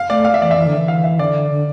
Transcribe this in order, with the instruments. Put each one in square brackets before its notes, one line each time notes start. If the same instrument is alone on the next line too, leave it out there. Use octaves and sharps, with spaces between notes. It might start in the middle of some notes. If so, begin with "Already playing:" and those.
Already playing: [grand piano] F5
[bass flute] A3 [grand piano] D5
[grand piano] F5
E5
[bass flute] E3 [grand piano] D5
[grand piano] E5
[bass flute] E3
D3
E3
[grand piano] F5
E5
[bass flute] D3 [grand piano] D5
[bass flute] D3